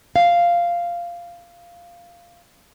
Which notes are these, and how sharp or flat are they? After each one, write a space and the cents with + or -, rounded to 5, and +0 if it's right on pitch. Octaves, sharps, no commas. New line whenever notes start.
F5 -10